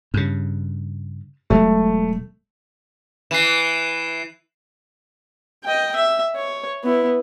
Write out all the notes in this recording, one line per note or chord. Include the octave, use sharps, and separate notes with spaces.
G2 C#3
E1 F#3 G#3 A3
E3 C7 E7
D#5 G5
E5
C#5
B3 E4